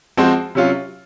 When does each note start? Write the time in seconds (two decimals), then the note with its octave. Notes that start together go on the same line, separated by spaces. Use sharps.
0.17 F3 G#3 C4 F#4 C5
0.55 C3 F#3 C#4 F4